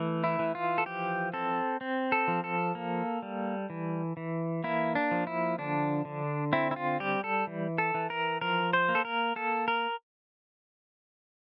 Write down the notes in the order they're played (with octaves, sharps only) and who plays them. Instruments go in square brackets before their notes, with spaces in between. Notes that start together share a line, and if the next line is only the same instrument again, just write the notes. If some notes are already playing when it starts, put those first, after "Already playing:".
Already playing: [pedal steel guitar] E3 A3
E4
E3
F4
A4
F3 G4
C4 A4
C4
A4
F3
A4
A#3
G3
E3
E3
A#3 E4
D4
F3
E4
D3 D4
D3
C4 E4
E4
F4
G3 G4
A4
E3
A4
E3
A#4
F3 A#4
C5
A#3
A4
A#4
A#3 A4
A#4